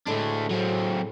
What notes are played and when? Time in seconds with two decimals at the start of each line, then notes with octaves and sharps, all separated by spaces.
0.07 A2 G#3 A3 D4
0.51 F#3 C4